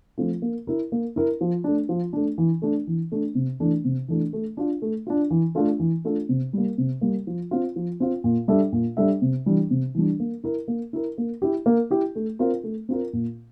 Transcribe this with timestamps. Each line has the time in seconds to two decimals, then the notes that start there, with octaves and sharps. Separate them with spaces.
0.18 F3 A3 C4 F4
0.42 A#3
0.67 E4 A#4
0.92 A#3
1.16 E4 A#4
1.41 F3
1.64 A3 D4
1.89 F3
2.13 A3 D4
2.38 E3
2.62 A3 D4
2.87 E3
3.12 A3 D4
3.35 C3
3.60 E3 A3 D4
3.85 C3
4.08 E3 A3 D4
4.33 A3
4.57 D4 F4
4.82 A3
5.07 D4 F4
5.31 E3
5.55 A3 D4 F4 A4
5.80 E3
6.05 A3 D4 F4 A4
6.29 C3
6.53 G3 A#3
6.78 C3
7.01 G3 A#3
7.27 F3
7.51 C4 F4
7.76 F3
8.00 C4 F4
8.24 A#2
8.48 G3 D4 A4 E5
8.72 A#2
8.97 G3 D4 A4 E5
9.22 C3
9.46 E3 G3 D4
9.71 C3
9.95 E3 G3 D4
10.20 A#3
10.44 E4 A#4
10.68 A#3
10.93 E4 A#4
11.18 A#3
11.42 E4 G4
11.66 A#3
11.91 E4 G4
12.15 A3
12.39 C4 F4 A#4
12.64 A3
12.89 C4 F4 A#4
13.13 A#2